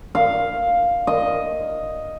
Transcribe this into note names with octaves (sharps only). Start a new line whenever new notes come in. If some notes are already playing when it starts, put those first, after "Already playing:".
F5
D#5